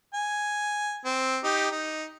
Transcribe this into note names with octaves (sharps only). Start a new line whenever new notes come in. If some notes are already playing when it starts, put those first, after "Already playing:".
G#5
C4
D#4 G4
D#4